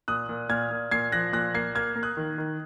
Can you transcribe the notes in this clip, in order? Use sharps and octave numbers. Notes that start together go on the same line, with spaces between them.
A#2 D#6 F#6
A#2
A#2 F6 G#6
A#2
A#2 G#6 C7
F3 F#6 A#6
A#2 F#6 A#6
A#3 G#6 C7
A#3 F6 G#6
A#3
D#6 F#6
D#3
D#3